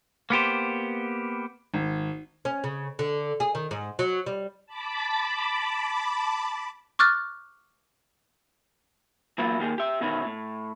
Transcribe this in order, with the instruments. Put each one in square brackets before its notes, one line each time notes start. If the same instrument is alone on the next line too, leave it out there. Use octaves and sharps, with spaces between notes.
[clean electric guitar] A#3 B3 G4 C5
[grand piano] G#1
[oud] C#4
C#3
D3
G#4
D#3
G#2
F#3
G3
[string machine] A5 B5 D6
[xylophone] C#6 D6 F6 F#6 A6
[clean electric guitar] E3 F#3 A#3 B3 E4 F4
D#3 A#3 G4 G#4
G4 E5
B2 D#3 E3 C#4 E4
A2